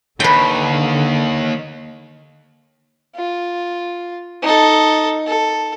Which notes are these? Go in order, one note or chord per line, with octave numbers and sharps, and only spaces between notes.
D#2 D3 B4 G5
F4
D#4 A4
A4